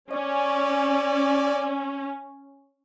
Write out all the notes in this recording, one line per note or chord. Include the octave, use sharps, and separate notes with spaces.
C#4 D5